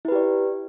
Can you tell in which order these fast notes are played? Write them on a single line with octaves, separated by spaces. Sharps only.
E4 B4 G4 D5